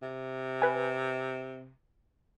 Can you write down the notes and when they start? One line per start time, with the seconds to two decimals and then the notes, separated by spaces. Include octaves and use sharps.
0.02 C3
0.62 B4 G#5